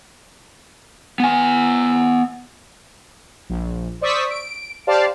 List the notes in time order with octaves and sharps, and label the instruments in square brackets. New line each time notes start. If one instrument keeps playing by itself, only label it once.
[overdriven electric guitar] B3 G#5
[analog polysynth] A#1
C5 D5 C#6 D#6 E6 B6
D7
G4 C5 D5 F5 A5